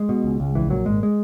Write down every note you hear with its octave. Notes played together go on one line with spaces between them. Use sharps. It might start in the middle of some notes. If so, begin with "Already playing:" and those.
Already playing: G#3
B2
C#2
C#2
A#1 E3
A#2 F#3
G#1 G#3
G#3